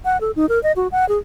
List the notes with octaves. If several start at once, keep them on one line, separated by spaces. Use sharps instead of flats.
F#5
A4
D#4
A#4
D#5
F#4
F#5
G#4